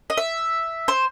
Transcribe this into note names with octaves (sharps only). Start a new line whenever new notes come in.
D#5
E5
C5